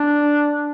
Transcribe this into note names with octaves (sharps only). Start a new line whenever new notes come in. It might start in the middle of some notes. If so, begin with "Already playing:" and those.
Already playing: D4